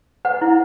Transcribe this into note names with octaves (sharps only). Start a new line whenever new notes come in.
B4 F#5
E4